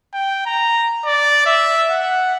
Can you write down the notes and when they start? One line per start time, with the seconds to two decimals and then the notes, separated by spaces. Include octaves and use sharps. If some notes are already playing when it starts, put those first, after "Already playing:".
0.14 G5
0.46 A#5
1.06 D5
1.46 E5
1.90 F#5